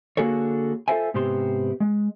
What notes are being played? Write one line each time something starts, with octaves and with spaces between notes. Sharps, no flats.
D3 A#3 F#4 G#4 A4 C#5
F4 A4 A#4 C5 E5 G#5
G#2 C3 B3 G4 C5 C6
G#3